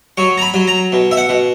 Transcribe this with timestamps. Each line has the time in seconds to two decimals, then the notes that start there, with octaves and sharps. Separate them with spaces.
0.17 F#3 C#6
0.38 A#5
0.42 B5
0.54 F#3
0.68 A#5
0.92 B2
1.11 E5
1.17 F#5
1.29 B2